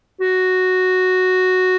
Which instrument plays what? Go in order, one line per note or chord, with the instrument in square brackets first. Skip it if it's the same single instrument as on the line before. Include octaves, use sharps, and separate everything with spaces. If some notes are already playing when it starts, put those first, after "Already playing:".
[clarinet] F#4